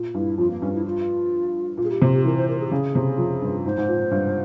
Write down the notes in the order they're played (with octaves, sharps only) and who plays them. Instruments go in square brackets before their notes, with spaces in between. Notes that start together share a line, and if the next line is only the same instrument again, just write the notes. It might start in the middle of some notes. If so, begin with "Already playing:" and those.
Already playing: [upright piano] A#2
[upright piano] G2 [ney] E4
[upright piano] F2 [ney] F4
[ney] A#3
[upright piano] G2 [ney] C#4
[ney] E4
F4
[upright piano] A#2
[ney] G#4
G4
[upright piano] C3
[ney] G4
[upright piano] E3 [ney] A#4
[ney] C5
A#4
G#4
G4
[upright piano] C#3 [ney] G#4
[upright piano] C3
F2
G2
[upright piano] G#2 [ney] C5
[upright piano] G#2
A#2
G2